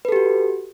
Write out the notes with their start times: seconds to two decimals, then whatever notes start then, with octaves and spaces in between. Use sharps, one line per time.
0.05 B4
0.09 A4
0.12 G4
0.16 F#4